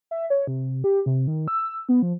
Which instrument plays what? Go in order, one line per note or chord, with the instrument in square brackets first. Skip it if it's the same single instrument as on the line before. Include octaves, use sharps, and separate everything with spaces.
[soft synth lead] E5
C#5
C3
G4
C3
D#3
E6
B3
F3